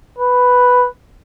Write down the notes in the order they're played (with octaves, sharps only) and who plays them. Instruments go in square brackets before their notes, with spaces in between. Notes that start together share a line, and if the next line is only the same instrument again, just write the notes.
[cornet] B4